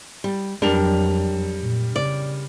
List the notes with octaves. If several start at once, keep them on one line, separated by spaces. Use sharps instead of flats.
G3
F2 F#3 G3 D4 A#4 F7
A#2
C#3 D5